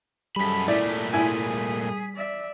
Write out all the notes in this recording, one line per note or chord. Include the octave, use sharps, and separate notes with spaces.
F#2 G3 G#4 A4 B5 B6
A#2 A3 E4 D5
E4 G#4 G#5
D5 E5